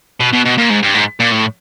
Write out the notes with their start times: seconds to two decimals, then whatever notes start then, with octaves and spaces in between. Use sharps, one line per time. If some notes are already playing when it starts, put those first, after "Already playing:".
0.20 B2
0.33 B2
0.45 B2
0.58 A#2
0.70 G#2
0.83 G2
0.94 G#2
1.20 A#2
1.32 A2